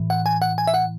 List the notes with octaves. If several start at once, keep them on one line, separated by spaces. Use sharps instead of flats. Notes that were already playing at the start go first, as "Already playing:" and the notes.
Already playing: A2 E3
F#5
G#5
F#5
G#5
E5
F#5